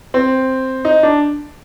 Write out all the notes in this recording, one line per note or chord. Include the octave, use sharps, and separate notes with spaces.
C4
D#4
D4